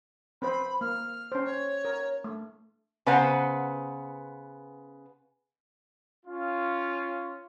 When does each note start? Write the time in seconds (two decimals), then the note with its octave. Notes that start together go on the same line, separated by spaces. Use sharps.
0.42 C4 B4 C5 B5
0.81 A#3 F6
1.32 C#4 C5
1.45 C#5
1.85 A#4
2.24 A3
3.06 C#3 B3 B4 C5 F#5 A#5
6.25 C#4 F4